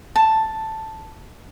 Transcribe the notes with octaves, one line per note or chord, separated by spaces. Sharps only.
A5